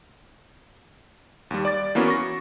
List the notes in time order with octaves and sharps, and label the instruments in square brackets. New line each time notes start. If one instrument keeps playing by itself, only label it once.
[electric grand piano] D#2 G3
D5 D6 A6
E3 A#3 B3 C#4 F#4
C#6 A#6